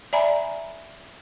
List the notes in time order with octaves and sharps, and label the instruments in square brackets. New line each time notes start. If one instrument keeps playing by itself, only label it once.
[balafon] D5 E5 G#5 A#5 B5